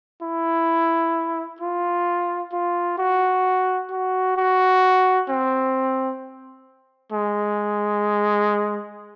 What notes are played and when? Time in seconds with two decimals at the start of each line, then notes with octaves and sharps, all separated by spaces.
0.22 E4
1.60 F4
2.53 F4
2.98 F#4
3.91 F#4
4.37 F#4
5.29 C4
7.12 G#3